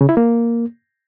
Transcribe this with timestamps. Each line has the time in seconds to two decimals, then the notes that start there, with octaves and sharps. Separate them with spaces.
0.01 C#3
0.09 E4
0.17 A#3